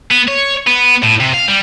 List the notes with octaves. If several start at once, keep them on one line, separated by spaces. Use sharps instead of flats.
B3
C#5
B3
A2
C3
F5
G3